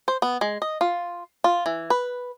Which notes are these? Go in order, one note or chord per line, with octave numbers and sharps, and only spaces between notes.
C5
B3
G#3
D#5
F4
F4
E3
B4